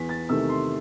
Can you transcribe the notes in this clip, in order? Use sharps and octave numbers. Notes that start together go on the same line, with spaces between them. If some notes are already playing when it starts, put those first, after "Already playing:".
Already playing: E2 B6
A6
C3 D#3 A3 E6
C6